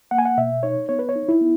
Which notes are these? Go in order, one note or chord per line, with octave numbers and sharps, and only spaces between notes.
A#3 F#5
G#5
F#5
B2 E5
D#4 C#5
B3 C#5
B4
C#5
D#4
E4
B3